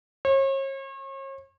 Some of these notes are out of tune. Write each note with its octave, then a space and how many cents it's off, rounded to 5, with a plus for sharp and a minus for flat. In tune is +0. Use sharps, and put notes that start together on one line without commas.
C#5 -40